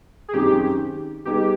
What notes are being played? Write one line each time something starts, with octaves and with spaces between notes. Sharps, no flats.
G#4
F#2 D#3 G#3 C4 D#4 G4
G3 B3 D#4 G4 G#4